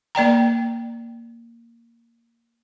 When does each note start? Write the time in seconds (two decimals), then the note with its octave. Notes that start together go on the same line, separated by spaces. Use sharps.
0.15 A#3 D5 G5 A#5